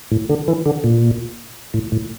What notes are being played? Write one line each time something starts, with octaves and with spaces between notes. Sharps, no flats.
A2
D3
E3
D3
A#2
A2
A2